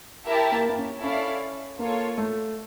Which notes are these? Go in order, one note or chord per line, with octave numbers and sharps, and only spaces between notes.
E4 G4 A#4 E5 A5
A#3
A#3
C#4
C#4 E4 A4 D5 F5
A#3 F4 A4 C#5
A3